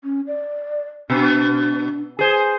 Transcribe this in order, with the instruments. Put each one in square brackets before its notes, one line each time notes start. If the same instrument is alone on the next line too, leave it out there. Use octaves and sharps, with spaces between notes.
[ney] C#4
D5
[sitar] B2 [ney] D4
[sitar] G#4 C5